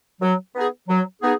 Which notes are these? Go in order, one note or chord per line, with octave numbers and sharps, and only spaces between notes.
F#3
B3 D#4 G#4
F#3
B3 D#4 G#4